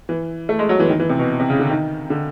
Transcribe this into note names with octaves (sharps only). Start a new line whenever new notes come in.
E3
A3
G#3
F#3
E3
D#3
E3
C3
B2
C3
C#3
D3
D#3
D3